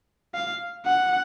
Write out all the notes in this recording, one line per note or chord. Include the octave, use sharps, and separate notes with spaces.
F5
F#5